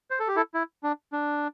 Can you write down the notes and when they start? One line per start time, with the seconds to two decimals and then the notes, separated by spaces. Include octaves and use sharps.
0.11 C5
0.20 A4
0.28 G4
0.36 E4 A4
0.54 E4
0.84 D4
1.13 D4